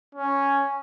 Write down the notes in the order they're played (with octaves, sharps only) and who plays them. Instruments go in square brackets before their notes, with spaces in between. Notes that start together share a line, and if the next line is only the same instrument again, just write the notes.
[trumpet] C#4